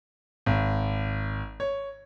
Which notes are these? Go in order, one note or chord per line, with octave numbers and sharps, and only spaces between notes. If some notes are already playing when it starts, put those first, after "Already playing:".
G#1
C#5